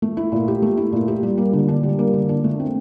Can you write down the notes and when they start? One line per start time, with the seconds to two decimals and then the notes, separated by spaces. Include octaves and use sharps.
0.02 A3
0.17 E4
0.32 A#2
0.48 G4
0.62 A3
0.77 E4
0.92 A#2
1.08 G4
1.23 G3
1.38 A#3
1.53 D3
1.68 D4
1.83 G3
1.99 A#3
2.13 D3
2.29 D4
2.44 A3
2.60 C4